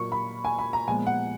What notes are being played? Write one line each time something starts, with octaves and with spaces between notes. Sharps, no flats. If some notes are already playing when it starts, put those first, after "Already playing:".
Already playing: A#2 F#3 A#3 C#6
B5
G#5
B5
A#5
A#2 F3 G#3 B3 G#5
F#5